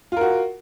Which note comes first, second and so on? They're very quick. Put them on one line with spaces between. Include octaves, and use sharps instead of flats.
F4 A#4 F#4